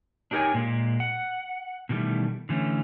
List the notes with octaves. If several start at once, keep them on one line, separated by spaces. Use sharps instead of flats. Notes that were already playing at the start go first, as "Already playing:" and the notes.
D4 D#4 G4 A#4 C#5 G#5
A#2 G#3 A#3
F#5
B2 D#3 E3 G3 A3
D3 E3 A3 C#4